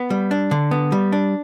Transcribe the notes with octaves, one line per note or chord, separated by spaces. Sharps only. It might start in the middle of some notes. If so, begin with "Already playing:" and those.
Already playing: B3
G3
D4
D3
B3
G3
D4